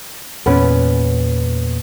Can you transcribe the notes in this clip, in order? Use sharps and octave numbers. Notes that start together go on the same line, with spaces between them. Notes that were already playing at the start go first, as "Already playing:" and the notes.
E2 A#2 B3 C#4 B4